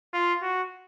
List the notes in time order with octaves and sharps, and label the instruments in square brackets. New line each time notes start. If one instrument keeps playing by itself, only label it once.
[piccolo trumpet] F4
F#4